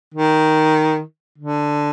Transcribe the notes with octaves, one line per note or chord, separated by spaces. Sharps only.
D#3
D3